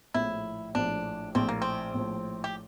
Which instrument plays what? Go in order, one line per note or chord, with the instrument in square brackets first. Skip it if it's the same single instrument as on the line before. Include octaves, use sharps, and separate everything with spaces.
[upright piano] A#1 A2 F3 [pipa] E4
[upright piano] A#1 A2 F3 [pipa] D4
[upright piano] A#1 A2 F3 [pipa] C4
[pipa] A#3
C4
[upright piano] A#1 A2 F3
[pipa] G4